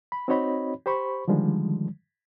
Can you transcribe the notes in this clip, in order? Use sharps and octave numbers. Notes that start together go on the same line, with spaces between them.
B5
C4 D#4 F#4 C#5 D#5 B5
G4 C5 B5 C#6
D3 D#3 F3 G3 G#3